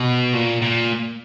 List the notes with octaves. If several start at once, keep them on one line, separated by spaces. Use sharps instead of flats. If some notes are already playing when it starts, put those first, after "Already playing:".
Already playing: B2
A#2
A#2